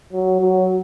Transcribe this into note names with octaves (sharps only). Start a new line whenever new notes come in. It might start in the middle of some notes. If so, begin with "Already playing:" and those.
F#3
F#3